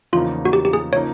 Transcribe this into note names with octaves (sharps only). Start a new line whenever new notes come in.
E2 C#3 F3 A#3 D#4 F4
F#4
G4
G4
G#4
C#3 F3 A#3 D#4 C#5